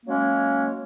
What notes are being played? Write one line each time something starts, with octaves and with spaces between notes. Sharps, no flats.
F#3 G#3 A#3 C#4